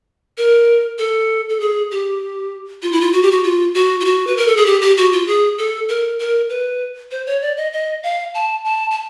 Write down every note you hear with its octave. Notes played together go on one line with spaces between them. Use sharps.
A#4
A4
A4
G#4
G4
F4
E4
F4
F#4
G4
F#4
F4
F#4
F4
F#4
B4
A#4
A4
G#4
G4
G4
F#4
F4
G#4
A4
A#4
A#4
B4
C5
C#5
D5
D#5
D#5
F5
A5
A5
A5